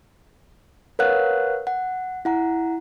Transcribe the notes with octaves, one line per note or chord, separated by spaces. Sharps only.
A#4 B4 C#5 F5 F#5 F#6
F#5
E4 F#5 A#5